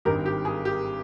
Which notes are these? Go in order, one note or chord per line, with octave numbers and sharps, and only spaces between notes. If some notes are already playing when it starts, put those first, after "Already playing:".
G#1 G2 D#3 G4 A#4
G4
G#4
G4